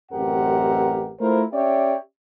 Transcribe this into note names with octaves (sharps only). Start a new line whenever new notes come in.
A1 F#2 C4 G4 A#4 F#5
A3 E4 F4 A#4 C5
C#4 G4 C#5 D5 E5